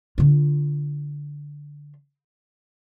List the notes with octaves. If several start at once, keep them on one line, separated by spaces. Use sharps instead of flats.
D3 F4